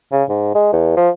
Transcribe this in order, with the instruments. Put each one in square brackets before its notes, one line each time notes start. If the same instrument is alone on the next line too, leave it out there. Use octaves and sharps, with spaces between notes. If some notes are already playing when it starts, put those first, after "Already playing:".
[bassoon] C#3
G#2
G#3
E2
F3